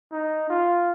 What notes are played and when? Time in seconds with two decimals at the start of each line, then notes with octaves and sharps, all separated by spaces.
0.12 D#4
0.50 F4